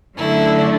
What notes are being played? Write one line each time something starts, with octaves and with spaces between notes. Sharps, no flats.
F#2 D3 A3 D4 E4